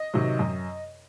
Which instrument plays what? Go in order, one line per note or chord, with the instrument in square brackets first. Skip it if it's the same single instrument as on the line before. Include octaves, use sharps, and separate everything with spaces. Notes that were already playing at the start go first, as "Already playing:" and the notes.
Already playing: [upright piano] D#5
C3 D#3 F#3
F#2